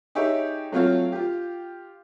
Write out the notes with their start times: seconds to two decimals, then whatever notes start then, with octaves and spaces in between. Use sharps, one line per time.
0.15 D#4 G4 G#4 C#5 E5 G5
0.72 F#3 A3 C4 F4 C#5 F5
1.12 F4 G4